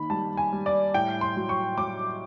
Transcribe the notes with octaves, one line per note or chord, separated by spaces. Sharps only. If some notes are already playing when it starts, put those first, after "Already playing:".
Already playing: D#3 A#3 B5
G3 A5
G#5
G3
D5
A2 G5
C6
F#3
C#6
F#3 D6